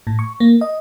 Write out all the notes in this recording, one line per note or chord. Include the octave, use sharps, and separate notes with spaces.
A2
C#6
A#3
D#5